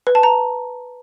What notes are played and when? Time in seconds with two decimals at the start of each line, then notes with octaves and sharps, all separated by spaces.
0.07 B4
0.15 A5
0.23 A#5